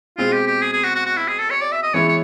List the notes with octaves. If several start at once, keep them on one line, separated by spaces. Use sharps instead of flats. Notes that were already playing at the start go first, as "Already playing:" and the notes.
B2 G#3 C4 F4
G4
G4
G#4
G#4
F#4
F#4
F#4
E4
G#4
A4
C#5
D5
E5
D#5
E3 G#3 B3 E4 C#5
C#5